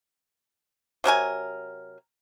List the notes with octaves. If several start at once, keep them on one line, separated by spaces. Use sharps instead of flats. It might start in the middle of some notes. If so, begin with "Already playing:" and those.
C3 F#3 A#4 G#5